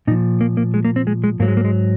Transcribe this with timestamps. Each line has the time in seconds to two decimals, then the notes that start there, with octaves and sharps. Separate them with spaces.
0.07 A#2 D#4
0.11 F3
0.41 A#3
0.57 A#3
0.74 G#3
0.85 A#3
0.96 C4
1.07 G#3
1.24 G#3
1.40 G#2 F#3 A#3
1.48 G#3
1.57 A#3
1.65 G#3